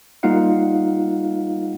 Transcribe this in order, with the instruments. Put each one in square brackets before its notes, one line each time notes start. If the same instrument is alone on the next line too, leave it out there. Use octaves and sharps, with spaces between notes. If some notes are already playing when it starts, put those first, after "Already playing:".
[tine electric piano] G3 A#3 D#4 F4 F5 F#5